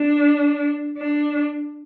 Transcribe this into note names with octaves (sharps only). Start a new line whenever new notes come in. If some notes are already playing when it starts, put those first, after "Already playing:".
Already playing: D4
D4